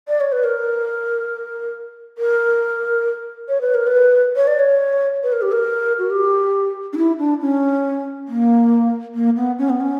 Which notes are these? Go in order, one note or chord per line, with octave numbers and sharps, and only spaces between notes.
D5
C#5
B4
A#4
A#4
C#5
B4
A#4
B4
C#5
D5
C#5
B4
A#4
G4
A#4
F#4
G4
D4
E4
D4
C#4
A#3
A#3
B3
C#4
B3
C#4